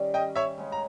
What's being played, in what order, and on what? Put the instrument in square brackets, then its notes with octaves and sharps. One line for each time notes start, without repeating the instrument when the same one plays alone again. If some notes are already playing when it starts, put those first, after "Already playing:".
Already playing: [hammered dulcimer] D#3 G3 C#4 G4
[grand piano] D#5 G5
C#5 E5
[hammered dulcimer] C#3 G#3 C#4
[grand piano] A#5